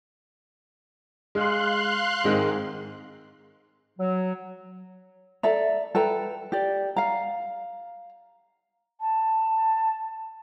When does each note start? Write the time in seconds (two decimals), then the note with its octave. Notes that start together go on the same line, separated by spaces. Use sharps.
1.35 G#3 F5 C6 F#6
2.24 G#2 D#3 G#3 C4
3.99 F#3
5.43 A4 D5 E5 A#5
5.95 A4 B4 G5 A#5
6.52 G4 D5
6.96 F5 A#5
9.00 A5